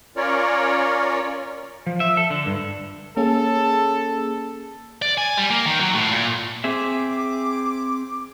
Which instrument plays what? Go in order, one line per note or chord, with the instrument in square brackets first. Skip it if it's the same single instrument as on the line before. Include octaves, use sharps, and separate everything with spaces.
[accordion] C#4 F4 A#4 C#5 D5
[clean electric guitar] F3
E5
A4
D3
G2
[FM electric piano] A#3 C#4 G#4 [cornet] A4
[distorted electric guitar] D5
G#5
G3
A#3
D#3
F#3
A2
A#2
[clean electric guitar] C4 G#4 E5 [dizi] D6